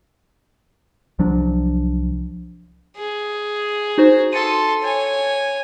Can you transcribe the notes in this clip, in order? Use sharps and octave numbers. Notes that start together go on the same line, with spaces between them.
C2 F3 F#3 D4
G#4
D#4 F#4 C5
A4 C6 A6 C#7 D#7
C#5 G#5